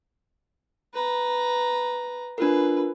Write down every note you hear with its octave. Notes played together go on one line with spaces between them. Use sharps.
B4 A#5
D4 F4 A#4 B4